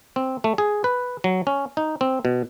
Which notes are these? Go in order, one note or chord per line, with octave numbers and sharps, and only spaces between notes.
C4
A3
G#4
B4
F#3
C#4
D#4
C4
B2